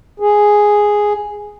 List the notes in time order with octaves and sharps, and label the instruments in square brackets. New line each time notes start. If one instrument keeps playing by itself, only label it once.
[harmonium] G#4